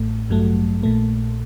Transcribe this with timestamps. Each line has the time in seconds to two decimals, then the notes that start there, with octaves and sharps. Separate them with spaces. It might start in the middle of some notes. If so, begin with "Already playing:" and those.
Already playing: A1 A2 A3
0.29 A1 G2 F#3 A3
0.83 A#1 A#2 A3